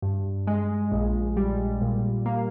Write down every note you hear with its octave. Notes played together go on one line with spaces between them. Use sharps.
G2
G#3
A#1
G3
A#2
A#3